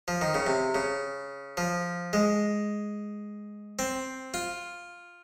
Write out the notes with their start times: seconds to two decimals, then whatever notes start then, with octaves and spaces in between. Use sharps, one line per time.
0.08 F3
0.21 D#3
0.34 C#3
0.47 C3
0.75 C#3
1.57 F3
2.13 G#3
3.79 C4
4.34 F4